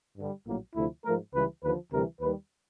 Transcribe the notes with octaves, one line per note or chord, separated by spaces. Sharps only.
G2 D3 G3
A#1 A2 F#3 A#3
D2 C3 F3 A3 E4
G#2 F3 A3 A#4
C#2 C#3 E3 G3 B4
D#2 D3 F3 B4
D2 C3 E3 G3 A#4
D#2 D#3 G3 B4